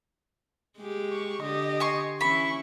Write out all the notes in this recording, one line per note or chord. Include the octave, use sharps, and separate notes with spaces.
G#3 G4
C#6
D3 G4 D#5
G#5 C6 C#6
E3 C#4 E4 B5 C#6